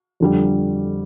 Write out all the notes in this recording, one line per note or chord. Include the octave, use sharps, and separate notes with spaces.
F2 D3 G3